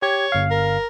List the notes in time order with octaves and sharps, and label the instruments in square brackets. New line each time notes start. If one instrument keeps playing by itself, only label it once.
[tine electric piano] G4 G#6 [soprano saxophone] C#5
[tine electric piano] G1 F5
[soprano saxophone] A#4